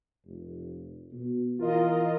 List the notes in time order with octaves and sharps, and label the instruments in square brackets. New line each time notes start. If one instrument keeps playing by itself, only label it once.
[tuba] F1
B2
[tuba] E3 [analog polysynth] F4 A#4 D#5